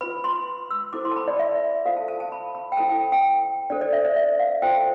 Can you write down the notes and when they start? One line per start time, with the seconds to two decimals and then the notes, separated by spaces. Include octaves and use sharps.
0.01 F4 B4 B5
0.24 C6
0.71 E6
0.93 E4 A4 C5 D6
1.05 C6
1.11 A5
1.16 B5
1.28 D5
1.39 E5
1.85 F4 A4 C5 F5
1.97 A5
2.08 A5
2.20 A5
2.32 B5
2.55 B5
2.72 G5
2.77 E4 A4 C5 A5
2.89 G5
3.12 G5
3.70 D4 A4 C5 D5
3.81 D5
3.93 E5
4.05 D5
4.16 E5
4.39 F5
4.62 F4 A4 C5 G5